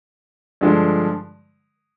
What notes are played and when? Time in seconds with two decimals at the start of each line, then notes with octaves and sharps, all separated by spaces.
0.61 G2 D3 F3 G#3